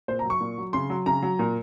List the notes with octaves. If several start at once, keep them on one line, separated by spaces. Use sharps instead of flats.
A#2 C5
A#5
F#3
C#6
A#2
F#3
C#3 C6
F#3
C#3 A#5
F#3
A#2